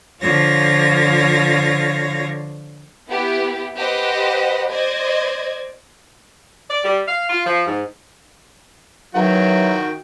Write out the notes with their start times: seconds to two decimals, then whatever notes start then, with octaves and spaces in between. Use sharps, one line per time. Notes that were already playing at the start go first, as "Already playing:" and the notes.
0.22 D3 F3 F4 C#5 F5 A#6
3.09 B3 E4 G4
3.77 G4 B4 C5 D#5 F#5
4.71 C5 D5 D#5 G#6
6.70 D5
6.84 G3
7.08 F5
7.30 F4
7.46 F3
7.67 G#2
9.15 E2 D#3 E3 F#3 F#4 G5